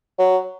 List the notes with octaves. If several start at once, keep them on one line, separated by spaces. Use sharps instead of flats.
F#3